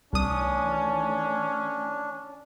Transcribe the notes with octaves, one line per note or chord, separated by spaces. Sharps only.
C2 D#3 E3 A3 C#4 D4 D#6